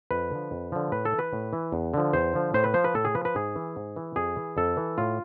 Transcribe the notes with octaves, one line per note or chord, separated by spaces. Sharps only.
F2 B4
D3 F3
F2
D3 F3
A2 B4
A4
E3
B4
A2
E3
E2
D3 F3
E2 C5
D3 F3
A2 C5
B4
F3 C5
B4
A2 A4
G#4
F3 B4
B4
G#2 G#4
E3
G#2
E3
F2 G#4
E3
F2 A4
E3
A2 F4